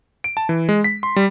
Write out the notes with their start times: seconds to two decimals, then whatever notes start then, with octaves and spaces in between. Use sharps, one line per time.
0.24 D7
0.37 A5
0.49 E3
0.69 G#3
0.84 B6
1.03 C6
1.16 G3